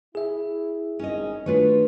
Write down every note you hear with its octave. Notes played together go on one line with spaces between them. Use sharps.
E4 G#4 E5
G#1 D#3 C#4 G#4 D#5
D#3 A3 D4 F4 F#4 B4 C#5